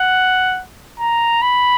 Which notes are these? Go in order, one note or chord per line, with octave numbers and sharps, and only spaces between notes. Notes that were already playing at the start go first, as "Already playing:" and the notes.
Already playing: F#5
A#5
B5